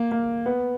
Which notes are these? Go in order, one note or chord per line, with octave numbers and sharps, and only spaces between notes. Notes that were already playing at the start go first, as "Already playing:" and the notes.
Already playing: A#3
A#3
B3